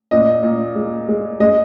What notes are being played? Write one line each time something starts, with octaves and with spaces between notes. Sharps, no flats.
A#2 D#5
A#2
G#3
G#3
G#3 D#5